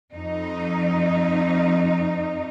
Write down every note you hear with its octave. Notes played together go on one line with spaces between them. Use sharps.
F2 D#4